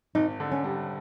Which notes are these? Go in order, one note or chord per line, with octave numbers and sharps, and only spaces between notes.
G#1 D#4
D3
C#4
G3